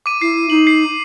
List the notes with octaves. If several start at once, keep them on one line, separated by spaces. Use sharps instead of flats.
D6 D#7
E4 C7
D#4 F#7
C7